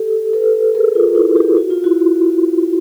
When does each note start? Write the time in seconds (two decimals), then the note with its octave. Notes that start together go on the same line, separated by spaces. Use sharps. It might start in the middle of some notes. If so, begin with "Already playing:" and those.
Already playing: G4 A4
0.33 A4 B4
0.75 G#4 A#4
0.95 F4
1.15 E4 F#4
1.36 F4 G4
1.57 F#4
1.70 F4
1.84 E4 F#4